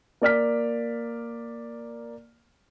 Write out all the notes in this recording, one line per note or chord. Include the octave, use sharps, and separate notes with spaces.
A#3 D5 F6 B6